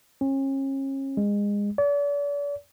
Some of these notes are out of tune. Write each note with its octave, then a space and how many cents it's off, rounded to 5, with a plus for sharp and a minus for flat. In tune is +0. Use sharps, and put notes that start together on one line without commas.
C#4 -35
G#3 -25
D5 -40